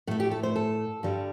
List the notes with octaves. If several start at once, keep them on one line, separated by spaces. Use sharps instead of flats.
A2 A3 A4
G4
A4
C5
A4
G2 D3 G3